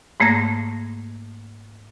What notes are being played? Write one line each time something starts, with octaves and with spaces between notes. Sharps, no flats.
G#2 A3 A#3 G#6 A#6